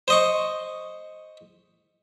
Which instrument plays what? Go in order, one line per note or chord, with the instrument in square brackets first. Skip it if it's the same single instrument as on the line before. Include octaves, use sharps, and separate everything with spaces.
[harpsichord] C5 D#5 C#6